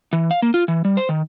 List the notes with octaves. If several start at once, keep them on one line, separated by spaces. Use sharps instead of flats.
E3
F5
A#3
F4
E3
G3
C5
D#3